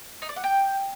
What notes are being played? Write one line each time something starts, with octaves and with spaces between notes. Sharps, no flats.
D#4
D5
F#5
G5